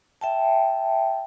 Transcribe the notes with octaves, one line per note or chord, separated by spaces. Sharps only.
E5 G5 A5